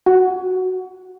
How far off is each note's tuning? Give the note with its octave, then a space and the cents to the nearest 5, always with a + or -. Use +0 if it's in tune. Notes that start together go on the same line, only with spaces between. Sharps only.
F#4 +0 F#5 +0